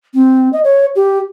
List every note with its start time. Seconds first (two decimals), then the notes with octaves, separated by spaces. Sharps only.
0.14 C4
0.53 D#5
0.64 C#5
0.95 G4